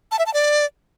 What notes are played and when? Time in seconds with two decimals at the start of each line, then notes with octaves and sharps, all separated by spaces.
0.11 A5
0.19 E5
0.26 A5
0.34 D5